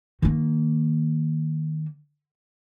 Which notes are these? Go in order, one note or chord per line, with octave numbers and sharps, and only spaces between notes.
D#3 A#3